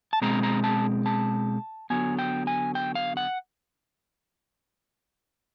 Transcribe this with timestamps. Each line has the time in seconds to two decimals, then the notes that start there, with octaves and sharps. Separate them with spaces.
0.13 A5
0.22 B2 G#3 C4 A#5
0.43 A#5
0.64 A5
1.06 A5
1.90 D3 F#3 B3 G#5
2.19 G5
2.47 G#5
2.75 G5
2.95 F5
3.17 F#5